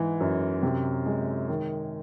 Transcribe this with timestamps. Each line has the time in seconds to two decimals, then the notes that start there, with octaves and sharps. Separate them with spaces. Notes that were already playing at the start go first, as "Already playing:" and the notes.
Already playing: G#2 E3
0.20 F#2
0.63 C3
1.06 G#3
1.49 D#3